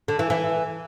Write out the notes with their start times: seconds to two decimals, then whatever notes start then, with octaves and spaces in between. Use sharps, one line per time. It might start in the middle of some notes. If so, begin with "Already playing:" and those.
0.08 D3
0.19 E3
0.30 E3